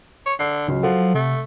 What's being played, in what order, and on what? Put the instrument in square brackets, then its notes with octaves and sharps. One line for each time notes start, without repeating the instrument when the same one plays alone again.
[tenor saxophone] C#5
[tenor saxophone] D3 [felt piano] C7
[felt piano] C#2 [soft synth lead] F#3
[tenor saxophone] F3 [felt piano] A4 F#5
[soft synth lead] C3 [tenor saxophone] A3